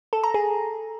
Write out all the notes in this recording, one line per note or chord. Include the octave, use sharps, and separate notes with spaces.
A4
A#5
G#4